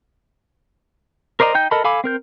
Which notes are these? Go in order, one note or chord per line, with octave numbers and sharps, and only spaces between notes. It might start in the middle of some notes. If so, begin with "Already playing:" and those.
A#4 C5 D5 D#5 A#5
D#4 G5 G6
A4 A#4 D#5 A5 B5
A4 F5 G#5 B5 D6
C4 A#4 G6